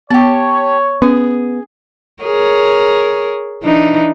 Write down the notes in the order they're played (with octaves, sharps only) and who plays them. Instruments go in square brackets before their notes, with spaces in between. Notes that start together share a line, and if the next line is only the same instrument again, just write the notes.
[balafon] B3 [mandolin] G4 A5 [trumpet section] C#5
[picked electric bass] B3 [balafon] C#4 [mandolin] G#4
[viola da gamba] G#4 A#4 C#5
E3 D4 D#4